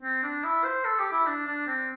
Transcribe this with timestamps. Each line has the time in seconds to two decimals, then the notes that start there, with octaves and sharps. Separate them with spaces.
0.02 C4
0.23 D4
0.44 E4
0.64 C5
0.85 A4
0.99 G4
1.12 E4
1.26 D4
1.47 D4
1.67 C4